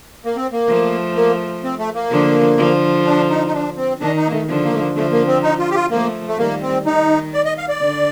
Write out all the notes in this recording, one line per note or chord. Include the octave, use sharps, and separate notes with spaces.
A#3
C4
A#3
F3 A3
A#3
C4
A3
A#3
D3 F3
D3 F3
D4
D#4
D#4
D4
C4
D#3 D4
D#4
A#3
A3
D3 F3
A#3
A3
A#3
D3 F3 A3
A#3
C4
D#4
F4
G4
F4
F3 A3 A#3
A3
D#3 G3 A#3
C4
D#3 D#4
D5
D#5
F5
D5
D3